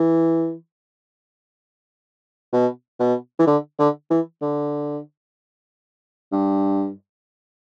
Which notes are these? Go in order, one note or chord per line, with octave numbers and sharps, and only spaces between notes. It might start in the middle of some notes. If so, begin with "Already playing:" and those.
Already playing: E3
B2
B2
E3
D3
D3
E3
D3
G2